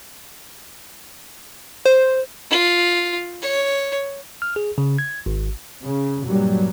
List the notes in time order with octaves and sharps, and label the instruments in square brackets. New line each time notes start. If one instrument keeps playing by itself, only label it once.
[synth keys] C5
[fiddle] F4
C#5
[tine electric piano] F6
G#4
C#3
G#6
G#1
[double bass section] C#3
G2 A#2 F#3 G3